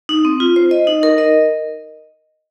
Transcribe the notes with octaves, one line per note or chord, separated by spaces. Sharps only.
D#4
C4
F4
C5
D#5
D#4
A#4
D#5